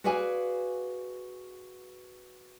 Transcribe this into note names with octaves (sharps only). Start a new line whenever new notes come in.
F#4 G#4 B4 D5 F5 G#5